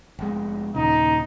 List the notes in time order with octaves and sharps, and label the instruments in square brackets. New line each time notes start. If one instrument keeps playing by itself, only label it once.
[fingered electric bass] F1 G#3
[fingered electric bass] D#2 A#2 C#3 [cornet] D#4